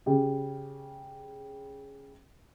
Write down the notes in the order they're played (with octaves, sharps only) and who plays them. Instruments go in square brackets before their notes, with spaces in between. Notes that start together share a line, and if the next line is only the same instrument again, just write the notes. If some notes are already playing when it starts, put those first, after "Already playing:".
[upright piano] C#3 G4